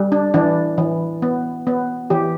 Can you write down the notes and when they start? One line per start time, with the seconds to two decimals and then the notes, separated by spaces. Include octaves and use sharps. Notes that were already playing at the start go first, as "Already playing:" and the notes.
Already playing: G3
0.12 D4
0.34 E3 D4
0.78 E3
1.22 B3
1.67 B3
2.10 E3 G4